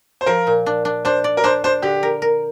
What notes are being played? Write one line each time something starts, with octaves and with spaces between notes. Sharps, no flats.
C5
F3 A#4
A#2
D4
D4
D4 C5
D5
A#4
D4 C5
D4 C5
D3 G4
A#4
A#4